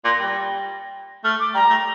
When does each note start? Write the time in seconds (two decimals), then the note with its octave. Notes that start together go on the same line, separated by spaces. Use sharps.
0.05 A#2 A#6
0.20 G3
1.24 A3 F6
1.40 D6
1.54 G3 A#5
1.70 A3